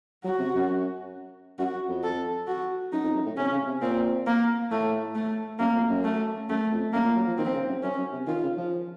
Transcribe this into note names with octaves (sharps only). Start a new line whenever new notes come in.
F#3 F#4
C3
F#2
F#2 F#4
F2
A4
F#4
F#2 D#4
F2
F#2
A2
C3 C#4
C#3
C3
A#2 C4
A#3
A2 A3
A3
F#2 A#3
F2
F#2
A3
F#2 A3
F2
F#2 A#3
A#2
F#3
F3
D#3 C4
C#3
F#2
F#2 C#4
F#2
C3
D#3 F4
C#3
F3